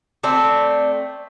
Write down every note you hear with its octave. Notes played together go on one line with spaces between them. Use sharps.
A3 C4 D5